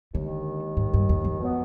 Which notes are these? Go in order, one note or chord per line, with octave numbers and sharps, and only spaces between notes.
D#2 D3 D#3 G#3
G#2
G2
F2
F2
B2 F#3 B3